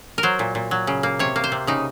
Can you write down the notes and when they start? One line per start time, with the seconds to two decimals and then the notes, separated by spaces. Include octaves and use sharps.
0.18 A#4
0.23 F#3 C5
0.39 A#2
0.55 A#2
0.71 F#3
0.87 C#3
1.03 A#3
1.19 C3 C#5
1.36 A#3
1.44 C5
1.52 C3
1.67 C#3 D#4